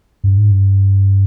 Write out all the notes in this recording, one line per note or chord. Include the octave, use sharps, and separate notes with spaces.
G2
G#2
G2